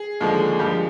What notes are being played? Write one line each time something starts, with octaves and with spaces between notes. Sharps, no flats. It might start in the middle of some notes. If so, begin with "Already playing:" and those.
Already playing: G#4
D#2 D3 F3 G#3
G2 F3 G#3 G4